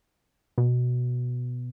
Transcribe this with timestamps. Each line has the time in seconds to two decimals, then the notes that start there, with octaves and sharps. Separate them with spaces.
0.58 B2